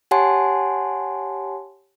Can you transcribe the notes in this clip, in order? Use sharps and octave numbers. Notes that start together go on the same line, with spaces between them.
G4 C#5 F#5 G#5 A5 C6